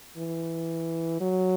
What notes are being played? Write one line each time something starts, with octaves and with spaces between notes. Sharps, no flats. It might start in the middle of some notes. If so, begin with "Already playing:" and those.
E3
F#3